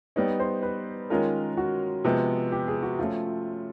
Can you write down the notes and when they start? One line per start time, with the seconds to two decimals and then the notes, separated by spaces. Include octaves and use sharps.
0.16 G3 B3 D#4 C#5
0.40 C5
0.63 B4
1.10 D#3 G#3 C#4 F4 A#4
1.57 F#4
2.04 C3 F3 G#3 B3
2.52 G4
2.68 G#4
2.83 F#4
2.99 F3 A3 C#4 F4